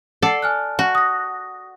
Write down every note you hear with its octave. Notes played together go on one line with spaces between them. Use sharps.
A4 D5 F#5 C7
G#5 F6 F#6
F#4
D#6 A#6